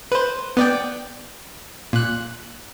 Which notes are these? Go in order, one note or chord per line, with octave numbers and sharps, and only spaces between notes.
B4 C5
B3 D5 G5
A#2 F#6